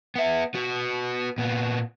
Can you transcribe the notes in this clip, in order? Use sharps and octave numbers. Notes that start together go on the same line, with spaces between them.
B3 E5
B3 F#4
A#2 B3